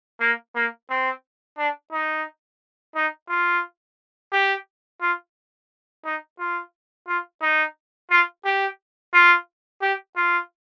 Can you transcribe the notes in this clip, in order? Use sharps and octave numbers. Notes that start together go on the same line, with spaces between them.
A#3
A#3
C4
D4
D#4
D#4
F4
G4
F4
D#4
F4
F4
D#4
F4
G4
F4
G4
F4